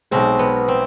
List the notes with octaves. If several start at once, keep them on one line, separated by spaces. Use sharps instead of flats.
B1 B2 G#3 C4
B3
C4